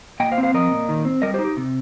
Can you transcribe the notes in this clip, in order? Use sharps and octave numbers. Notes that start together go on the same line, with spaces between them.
A#2 D#5 G5
C5 F5
C4
C5 F5
F3 A#4 D#5
A#2
D#3
C4
G3 A#4 D#5
G4 C5
D#4
G4
C3